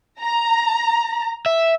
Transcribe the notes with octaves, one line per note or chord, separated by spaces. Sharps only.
A#5
E5